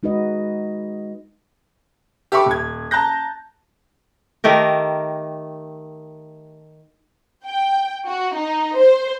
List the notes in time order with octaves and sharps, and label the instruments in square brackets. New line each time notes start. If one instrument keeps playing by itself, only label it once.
[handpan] G#3 D#4 F#4 B4 D#5
[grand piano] G4 A4 E5 B5 C#6 D6
D#1 G#6
A5 A#5 F#6 G6 A#6
[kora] D#3 A3 G4 A#4
[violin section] G5
F#4
D#4
C5